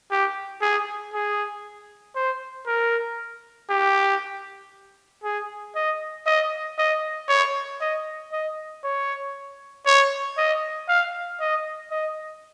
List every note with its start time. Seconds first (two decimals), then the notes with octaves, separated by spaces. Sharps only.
0.11 G4
0.62 G#4
1.13 G#4
2.15 C5
2.67 A#4
3.70 G4
5.24 G#4
5.75 D#5
6.26 D#5
6.78 D#5
7.29 C#5
7.81 D#5
8.32 D#5
8.84 C#5
9.86 C#5
10.38 D#5
10.88 F5
11.40 D#5
11.91 D#5